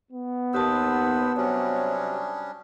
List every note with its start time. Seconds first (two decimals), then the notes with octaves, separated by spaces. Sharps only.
0.12 B3
0.53 D#2 B4 C5 A5 D#6 E6
1.37 C3 F#3 G3 C#4 D4